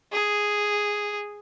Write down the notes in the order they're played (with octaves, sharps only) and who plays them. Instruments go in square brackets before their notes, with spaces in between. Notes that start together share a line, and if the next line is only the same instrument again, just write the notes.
[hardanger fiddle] G#4